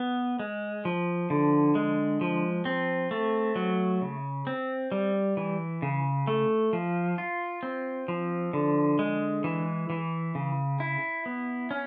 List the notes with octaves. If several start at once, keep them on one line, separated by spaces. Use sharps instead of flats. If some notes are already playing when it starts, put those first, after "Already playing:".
Already playing: B3
G#3
F3
D3
G#3
F3
C4
A3
F#3
C#3
C4
G3
E3
C#3
A3
F3
F4
C4
F3
D3
G#3
E3
E3
C#3
E4
B3
C#4